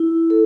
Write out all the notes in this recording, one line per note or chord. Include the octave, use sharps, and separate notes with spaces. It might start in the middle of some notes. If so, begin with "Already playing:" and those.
Already playing: E4
A4